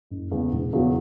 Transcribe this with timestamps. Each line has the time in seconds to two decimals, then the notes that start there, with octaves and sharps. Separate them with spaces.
0.10 F#1
0.31 E2 C#3 G#3
0.52 E1
0.73 E2 C#3 F#3